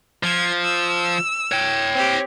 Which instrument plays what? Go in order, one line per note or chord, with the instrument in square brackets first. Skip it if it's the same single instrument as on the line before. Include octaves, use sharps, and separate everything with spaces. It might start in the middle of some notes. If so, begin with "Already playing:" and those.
[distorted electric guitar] F3 [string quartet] G#6
[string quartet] E6
[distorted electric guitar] C#5 G5
[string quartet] C4 G4